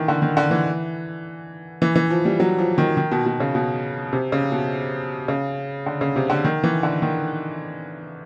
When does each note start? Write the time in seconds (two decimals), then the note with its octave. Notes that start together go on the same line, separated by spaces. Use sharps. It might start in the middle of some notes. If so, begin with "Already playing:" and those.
Already playing: D#3 E3
0.08 D3
0.22 D#3
0.37 D3
0.51 E3
1.82 E3
1.95 E3
2.10 F3
2.25 G3
2.40 F#3
2.58 F3
2.78 D#3
2.97 D#3
3.11 B2
3.26 B2
3.40 C#3
3.55 B2
4.13 C3
4.32 C#3
4.52 B2
5.28 C#3
5.86 D3
6.01 C#3
6.16 C3
6.30 D3
6.45 D#3
6.64 E3
6.83 D3
7.02 D#3